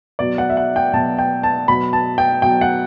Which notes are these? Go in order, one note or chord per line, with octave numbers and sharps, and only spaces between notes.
B2 F#3 D5
F#5
E5
F#5
G5
B2 F#3 A5
G5
A5
B2 F#3 B5
A5
G5
B2 F#3 G5
F#5